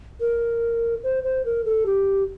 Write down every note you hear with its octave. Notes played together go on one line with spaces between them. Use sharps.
A#4
C5
C5
A#4
A4
G4